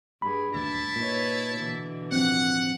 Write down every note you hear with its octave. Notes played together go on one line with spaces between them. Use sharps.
G2 G#4 B5
D#1 D2 D4 E4 E5 A5
A#2 D#4 B4 C#5
B2 D3 E3
D1 F3 C4 F#5